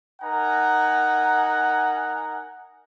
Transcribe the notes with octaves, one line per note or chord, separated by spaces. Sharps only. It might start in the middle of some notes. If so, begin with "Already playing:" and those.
D#4 A#4 F#5 G#5 A#5